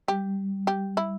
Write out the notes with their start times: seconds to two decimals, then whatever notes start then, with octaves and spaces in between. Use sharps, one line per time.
0.08 G3 G4
0.67 G4
0.97 E4